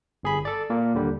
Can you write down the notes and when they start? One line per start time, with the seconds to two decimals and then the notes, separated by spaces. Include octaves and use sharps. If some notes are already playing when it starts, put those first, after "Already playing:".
0.23 G1 G#4 B5
0.45 A4 D5
0.70 A#2 A#3
0.94 D#2 D3 G3